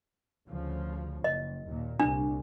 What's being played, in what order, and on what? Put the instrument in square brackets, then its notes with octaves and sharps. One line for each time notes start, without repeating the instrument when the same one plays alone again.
[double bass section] D2 C#3 F3
[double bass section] F#1 [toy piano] D#5
[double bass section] D#2 A#2
[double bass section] C2 [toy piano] D4